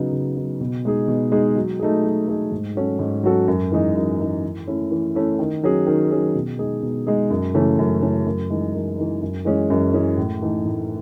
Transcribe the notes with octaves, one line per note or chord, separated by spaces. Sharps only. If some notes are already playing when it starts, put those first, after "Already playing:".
Already playing: C#3 F#3 B3 D#4
C#3
F#3 B3 D#4
B2
G#3 D#4 G#4
B2
G#3 D#4 G#4
F#3
A3 D#4 G#4
F#3
A3 D#4 G#4
G#2
F#3 C#4 F#4 A4
G#2
F#3 C#4 F#4 A4
F#2
E3 G#3 D#4
F#2
E3 G#3 D#4
E3
A3 C#4 E4
E3
A3 C#4 E4
D#3
F#3 C#4 G#4
D#3
F#3 C#4 G#4
B2
G#3 D#4 G#4
B2
G#3 D#4 G#4
F#2
C#3 E3 A3 C#4
F#2
C#3 E3 A3 C#4
F#2
E3 G#3 D#4
F#2
E3 G#3 D#4
F#2
E3 G#3 C#4 G#4
F#2
E3 G#3 C#4 G#4
A2
E3 A3 D#4
A2